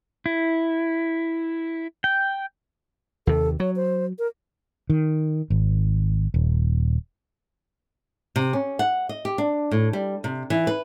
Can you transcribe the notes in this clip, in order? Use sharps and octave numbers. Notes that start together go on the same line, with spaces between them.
E4
G5
D#2 C3 A4
F#3 C#5
C5
A#4
D#3
G#1
D#1
C3
C#4
F#5
D#5
G4
D4
A2
G3
C3
E3
B4